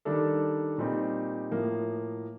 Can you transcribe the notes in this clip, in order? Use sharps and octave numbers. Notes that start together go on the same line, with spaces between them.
D#3 G3 D4 A4
A#2 G3 C4 D#4
A2 F3 A#3